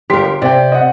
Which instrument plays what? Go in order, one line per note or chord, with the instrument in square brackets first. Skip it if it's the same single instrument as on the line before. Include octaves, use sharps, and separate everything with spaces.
[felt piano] G1 C6 B6 [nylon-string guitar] G4 A#4
[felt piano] C6
[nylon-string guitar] C3 [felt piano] D5 G5
[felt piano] D#5 F#5